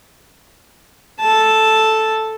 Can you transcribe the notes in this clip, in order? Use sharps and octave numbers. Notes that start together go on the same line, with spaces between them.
A4 A5